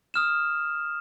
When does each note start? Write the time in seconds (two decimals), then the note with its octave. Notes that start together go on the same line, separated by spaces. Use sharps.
0.14 D#6 F6 E7